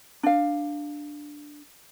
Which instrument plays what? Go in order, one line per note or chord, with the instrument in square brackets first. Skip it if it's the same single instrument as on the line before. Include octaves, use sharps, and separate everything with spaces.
[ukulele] D4 F5